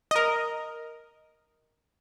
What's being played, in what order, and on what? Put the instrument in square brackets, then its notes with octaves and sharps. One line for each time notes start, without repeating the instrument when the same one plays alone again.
[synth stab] A#4 D#5